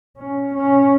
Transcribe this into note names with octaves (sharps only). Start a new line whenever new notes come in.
C#4
C#4